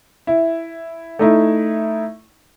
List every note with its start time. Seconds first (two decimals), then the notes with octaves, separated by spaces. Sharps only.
0.27 E4
1.19 A3 D#4 E4